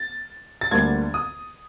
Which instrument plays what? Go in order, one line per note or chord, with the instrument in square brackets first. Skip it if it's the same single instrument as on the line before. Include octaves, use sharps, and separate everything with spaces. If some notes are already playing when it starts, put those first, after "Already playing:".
Already playing: [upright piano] A6
A6
D2 D3 G3 A#3 D4 G#6
D#6